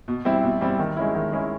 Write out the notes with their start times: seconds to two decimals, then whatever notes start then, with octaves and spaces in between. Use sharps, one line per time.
0.08 B2
0.25 G3 C4 E4
0.43 B2
0.61 G3 C4 E4
0.79 D#3
0.97 G#3 C#4 E4
1.15 D#3
1.32 G#3 C#4 E4